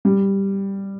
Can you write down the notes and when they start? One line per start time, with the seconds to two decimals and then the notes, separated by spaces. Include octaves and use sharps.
0.05 G3